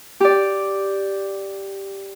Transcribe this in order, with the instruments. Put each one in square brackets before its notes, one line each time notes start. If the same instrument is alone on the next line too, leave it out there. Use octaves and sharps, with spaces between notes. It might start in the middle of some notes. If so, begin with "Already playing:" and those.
[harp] G4 D5